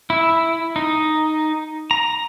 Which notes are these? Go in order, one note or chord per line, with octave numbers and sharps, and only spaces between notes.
E4
D#4
A#5